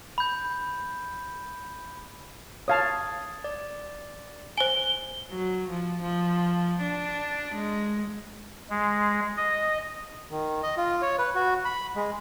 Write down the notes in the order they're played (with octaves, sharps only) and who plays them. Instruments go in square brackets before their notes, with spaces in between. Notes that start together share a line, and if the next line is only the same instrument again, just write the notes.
[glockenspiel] B5 G6
[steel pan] C#5 F5 A5 [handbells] D#6 G#6 A6
[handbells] D5
[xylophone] C5 G#5 [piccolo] G7
[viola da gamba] F#3
F3
F3
D4
G#3
[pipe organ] G#3
D#5
[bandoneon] D#3
D#5
F4
C#5
B4
F#4
B5
G#3